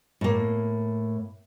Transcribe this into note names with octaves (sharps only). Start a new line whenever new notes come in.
A2 A#3